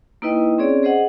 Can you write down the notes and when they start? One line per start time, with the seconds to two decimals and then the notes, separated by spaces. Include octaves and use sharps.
0.22 A#3 D#4 E4 B4 D#5 G5
0.58 C4 C#4 G#4 C#5 D5
0.83 G#4 C5 D#5 F#5